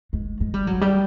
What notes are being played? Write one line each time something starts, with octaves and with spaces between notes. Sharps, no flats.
G#3
G#3
G3
F#3
G3